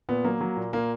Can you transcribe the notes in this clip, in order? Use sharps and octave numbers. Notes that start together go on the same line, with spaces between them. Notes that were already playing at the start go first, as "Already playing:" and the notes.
A#2 B3
F#3 A#3
F#3
A#2
A#2 A#3